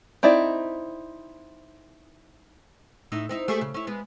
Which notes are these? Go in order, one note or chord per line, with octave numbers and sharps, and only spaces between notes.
C4 D#4 E4 D5
A2 D#4 E4
C4 D#4 E4
A3 G4 G#4
C#3
C#4 E4
G#3 B3